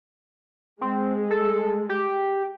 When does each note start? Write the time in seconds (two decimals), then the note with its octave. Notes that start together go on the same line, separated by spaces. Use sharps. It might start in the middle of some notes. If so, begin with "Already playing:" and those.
0.81 G#3 C4
1.30 A4
1.89 G4